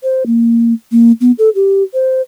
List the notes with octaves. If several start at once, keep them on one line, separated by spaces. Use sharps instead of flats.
C5
A#3
A#3
B3
A4
G4
C5